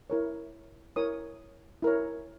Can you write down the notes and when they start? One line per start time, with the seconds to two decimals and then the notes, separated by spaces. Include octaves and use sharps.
0.10 E4 A#4 C#5
0.96 E4 A#4 C#5 D#6
1.82 E4 A#4 C#5